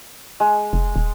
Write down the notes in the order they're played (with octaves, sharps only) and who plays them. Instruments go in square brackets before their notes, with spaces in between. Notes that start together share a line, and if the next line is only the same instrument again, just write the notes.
[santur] G#3
[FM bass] F1
D#1